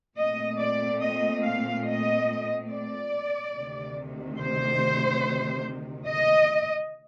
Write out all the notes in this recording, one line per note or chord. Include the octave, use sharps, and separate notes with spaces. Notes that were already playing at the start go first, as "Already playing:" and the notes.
A#2 A3 C4 D#5
D5
D#5
F5
D#5
D5
D2 C3 D#3
C5
D#5